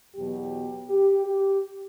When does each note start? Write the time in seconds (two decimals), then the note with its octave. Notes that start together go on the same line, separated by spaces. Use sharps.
0.15 E2 B2 F#3 G4
0.89 G4
1.26 G4